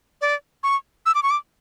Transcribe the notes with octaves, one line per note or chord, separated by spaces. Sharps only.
D5
C#6
E6
D6
C#6
D6